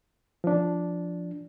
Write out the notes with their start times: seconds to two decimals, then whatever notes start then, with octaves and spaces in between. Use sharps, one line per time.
0.44 F3 D4